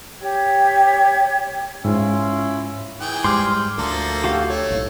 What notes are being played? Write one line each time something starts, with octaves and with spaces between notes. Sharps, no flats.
G4 C#5 G5 G#6
G#2 C#4 E4 F4
E3 G#4 G5
G#2 G3 C6 D6 F6
D2 F3 A#3 A4
F#4 G4 F5
A3 C#5
B1 A2